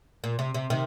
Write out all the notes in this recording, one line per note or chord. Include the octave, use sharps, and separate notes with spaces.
A#2
C3
C3
C3 D#3